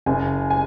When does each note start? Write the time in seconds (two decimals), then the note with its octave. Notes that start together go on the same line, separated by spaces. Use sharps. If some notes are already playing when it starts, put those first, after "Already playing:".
0.06 F#1 G#5
0.50 G#5